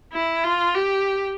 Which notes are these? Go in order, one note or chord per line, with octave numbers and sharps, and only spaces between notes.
E4
F4
G4